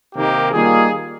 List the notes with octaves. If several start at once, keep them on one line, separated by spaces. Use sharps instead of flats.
C3 D#3 A#3 D#4 G4
D#3 G3 A#3 F4 G#4